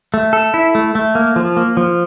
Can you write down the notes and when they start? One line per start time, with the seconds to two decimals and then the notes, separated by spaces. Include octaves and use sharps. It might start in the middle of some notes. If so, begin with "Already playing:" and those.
0.14 A3
0.33 A4
0.54 E4
0.75 A3
0.95 A3
1.15 A#3
1.36 F3
1.57 A#3
1.77 F3